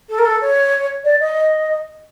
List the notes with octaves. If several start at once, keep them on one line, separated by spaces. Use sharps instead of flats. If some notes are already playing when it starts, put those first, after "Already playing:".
A4
A#4
A4
C#5
D5
D#5